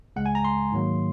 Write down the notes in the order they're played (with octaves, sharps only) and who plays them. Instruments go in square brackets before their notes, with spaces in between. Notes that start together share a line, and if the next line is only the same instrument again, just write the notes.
[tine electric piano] C#2 C#3 G#3 F#5
G#5
A#5
C6
G#2 D#3 F#3 A#3